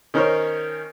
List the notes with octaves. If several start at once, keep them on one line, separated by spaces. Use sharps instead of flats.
D#3 C#4 D#4 A#4 C5 C#5